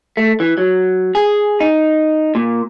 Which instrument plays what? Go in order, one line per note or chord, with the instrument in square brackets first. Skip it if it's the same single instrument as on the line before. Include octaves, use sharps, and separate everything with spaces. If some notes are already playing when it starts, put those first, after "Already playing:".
[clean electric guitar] A3
E3
F#3
G#4
D#4
A#2